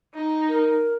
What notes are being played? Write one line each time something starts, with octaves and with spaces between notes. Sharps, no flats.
D#4
A#4